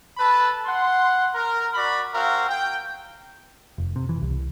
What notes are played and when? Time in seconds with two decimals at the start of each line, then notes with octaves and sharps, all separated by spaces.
0.17 A4 B4 A5 B5
0.65 F#5 C6
1.34 A#4
1.74 F#4 D5 B5
2.14 C4 F#4 A#4 F5
2.49 G5
3.78 F1
3.96 C3
4.09 E3
4.22 C2